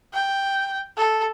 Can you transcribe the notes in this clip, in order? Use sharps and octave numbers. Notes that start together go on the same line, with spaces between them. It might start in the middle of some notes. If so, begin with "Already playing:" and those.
G5
A4